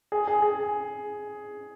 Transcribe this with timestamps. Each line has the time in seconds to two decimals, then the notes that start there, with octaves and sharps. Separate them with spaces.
0.12 G#4
0.28 G#4
0.42 G#4